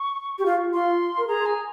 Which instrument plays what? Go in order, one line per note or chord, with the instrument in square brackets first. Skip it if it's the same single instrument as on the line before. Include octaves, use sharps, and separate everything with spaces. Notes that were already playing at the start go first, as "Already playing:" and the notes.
Already playing: [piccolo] C#6
[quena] G4
F4
[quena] F4 [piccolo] C6
[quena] A#4
[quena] G#4 [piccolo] A#5
[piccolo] G#5